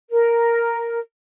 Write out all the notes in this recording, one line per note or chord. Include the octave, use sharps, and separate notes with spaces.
A#4